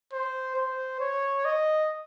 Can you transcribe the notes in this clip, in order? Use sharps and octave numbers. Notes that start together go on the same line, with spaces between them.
C5
C5
C#5
D#5